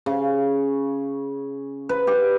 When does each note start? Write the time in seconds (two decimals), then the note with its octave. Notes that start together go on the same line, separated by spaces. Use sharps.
0.06 C#3
1.89 B4
2.07 G4